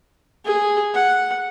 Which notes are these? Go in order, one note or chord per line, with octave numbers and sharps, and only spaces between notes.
G#4
F#5